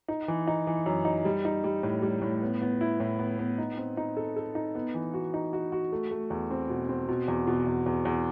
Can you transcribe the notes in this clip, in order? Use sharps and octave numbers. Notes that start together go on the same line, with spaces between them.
D#4
E3
D#4
E3
F#2
D#4
G3
D#4
G3
A2
G3
A2
B3
B3
E4
A2
B3
B3
D#4
C4
D#4
A4
A4
D#4
B3
E3
F#4
D#4
F#4
F#4
A3
A3
E2
C4
B2
C4
B2
E2
B2
E2
E2
E2